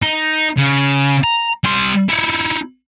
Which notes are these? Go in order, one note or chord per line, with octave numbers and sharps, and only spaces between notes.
D#4
C#3
A#5
G3 C6
D#4 E4